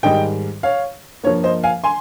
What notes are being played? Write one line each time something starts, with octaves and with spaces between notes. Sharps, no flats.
G#2 D#3 G3 D#5 G5
C#5 F5
G2 F3 A#3 C#5
C5 D#5
F5 G#5
G#5 C6